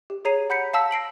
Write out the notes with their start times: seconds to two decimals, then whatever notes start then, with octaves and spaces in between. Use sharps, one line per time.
0.10 G4
0.25 G#4 C#5 A#5 C7 D#7
0.50 F#5 B5 G6 B6 C#7
0.73 F5 A5 E6 B6
0.91 A#6 C7 D7 F#7